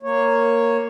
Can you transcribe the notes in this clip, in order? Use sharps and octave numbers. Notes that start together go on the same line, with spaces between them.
A#3 C#5